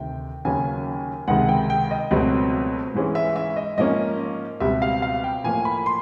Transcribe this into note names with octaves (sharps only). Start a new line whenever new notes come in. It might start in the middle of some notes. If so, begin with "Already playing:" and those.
Already playing: D2 C3 D#3 G5
D#2 C#3 F#3 A#3 C#4 G#5
C#2 C3 D#3 G#3 F#5
G5
G5
D#5
C#2 B2 F#3 A3 C4
G#2 E3 G#3 C#4
E5
E5
D#5
G#2 F3 A#3 C#4 D#5
C#2 B2 G3 C4 E5
F5
F5
G5
A2 F3 A#3 G#5
B5
C6